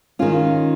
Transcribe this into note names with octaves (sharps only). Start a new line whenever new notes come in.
D#3 G#3 C#4 F4